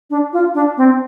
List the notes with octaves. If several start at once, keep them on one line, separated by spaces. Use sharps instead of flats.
D4
F4
D4
C4